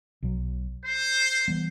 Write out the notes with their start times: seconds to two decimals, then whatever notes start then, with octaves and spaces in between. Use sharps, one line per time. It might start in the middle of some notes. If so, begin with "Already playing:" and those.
0.22 B1 B2 F#3
0.85 C5
1.48 E3 G3 B3